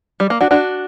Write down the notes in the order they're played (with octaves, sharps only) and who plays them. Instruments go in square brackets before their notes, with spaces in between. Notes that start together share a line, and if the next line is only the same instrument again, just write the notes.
[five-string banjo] G3
A#3
D4 F#4
D4 F#4